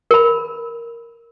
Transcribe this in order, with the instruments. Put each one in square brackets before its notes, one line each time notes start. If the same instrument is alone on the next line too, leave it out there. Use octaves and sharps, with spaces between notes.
[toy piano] A#4 B5